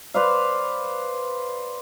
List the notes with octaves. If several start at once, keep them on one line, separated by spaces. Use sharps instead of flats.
B4 C5 D5 F5